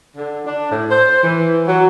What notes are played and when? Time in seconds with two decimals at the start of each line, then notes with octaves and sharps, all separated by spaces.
0.17 D3
0.47 D4
0.72 A2
0.90 C5
1.23 E3
1.67 F#3